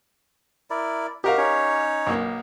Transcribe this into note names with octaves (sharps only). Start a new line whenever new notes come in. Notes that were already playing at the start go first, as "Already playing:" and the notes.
E4 A#4 D5
D#4 F#4 G4 A#4 F5
C#4 D#4 C#5
B1 A#3